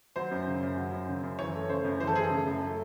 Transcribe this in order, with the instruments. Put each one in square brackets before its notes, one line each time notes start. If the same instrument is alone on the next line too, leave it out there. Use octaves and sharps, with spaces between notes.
[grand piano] F#3 C5
F#2
C#3
F#2
F#3
F#2
C#3
F#2
E3 C#5
A3
C#3 C5
F#2
E3 C5
A4
A3 G#4
A4
C#3
F#2
A3